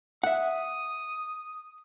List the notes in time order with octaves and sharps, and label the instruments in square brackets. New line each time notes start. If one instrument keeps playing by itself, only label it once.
[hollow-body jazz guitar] E5 F#5 [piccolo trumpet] D#6